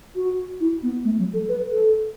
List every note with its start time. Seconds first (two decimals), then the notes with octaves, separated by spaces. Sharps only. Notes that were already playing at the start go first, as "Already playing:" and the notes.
0.16 F#4
0.61 E4
0.83 B3
1.05 A3
1.19 F#3
1.33 A4
1.49 B4
1.71 A4